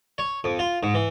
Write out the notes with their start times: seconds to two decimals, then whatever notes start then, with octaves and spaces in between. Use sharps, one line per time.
0.18 C#5
0.44 F2
0.59 F4
0.83 G#2
0.94 E3